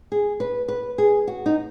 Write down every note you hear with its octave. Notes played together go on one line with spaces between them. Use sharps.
G#4
B4
B4
G#4
F#4
D#4